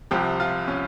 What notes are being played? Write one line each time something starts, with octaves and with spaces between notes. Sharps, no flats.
C2 C3 F3 G4
F4
C#4